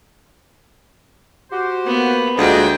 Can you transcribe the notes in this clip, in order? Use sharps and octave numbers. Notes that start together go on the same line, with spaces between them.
F#4 G4 C5
A#3 B3
D2 G#3 D4 F4 D#5 F#5 G5